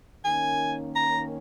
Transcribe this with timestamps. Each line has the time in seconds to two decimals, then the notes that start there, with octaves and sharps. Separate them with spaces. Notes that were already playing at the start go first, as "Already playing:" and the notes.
0.24 D#3 A#3 C#4 G#5
0.95 A#5